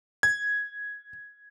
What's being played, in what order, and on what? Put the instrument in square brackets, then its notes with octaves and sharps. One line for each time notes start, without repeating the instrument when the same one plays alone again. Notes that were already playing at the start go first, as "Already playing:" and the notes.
[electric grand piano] G#6